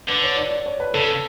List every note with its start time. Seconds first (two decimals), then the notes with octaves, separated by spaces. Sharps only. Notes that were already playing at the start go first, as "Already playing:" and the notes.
0.09 D3 B4
0.23 C#5
0.37 D5
0.51 D5
0.66 C#5
0.80 B4
0.94 C#3 A4